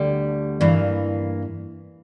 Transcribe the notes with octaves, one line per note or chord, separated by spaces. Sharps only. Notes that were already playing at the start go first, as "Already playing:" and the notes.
Already playing: D2 D3 G3
G2 E3 A#3